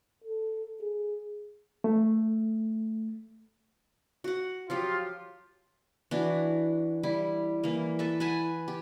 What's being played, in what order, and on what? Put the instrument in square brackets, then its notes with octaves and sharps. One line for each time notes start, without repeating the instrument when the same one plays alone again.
[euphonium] A4
G#4
[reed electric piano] A3
[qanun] F#4 F#5
[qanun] F3 F#3 G4 [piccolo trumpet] F4
[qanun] E3 D4 F#4
G3 E4
E3 A#3
A4 B4 E5
B4 F#5 G#5 A5
G4